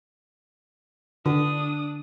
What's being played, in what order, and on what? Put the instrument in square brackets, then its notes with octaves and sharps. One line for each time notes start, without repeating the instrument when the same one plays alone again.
[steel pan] D3 [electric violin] D4 D#6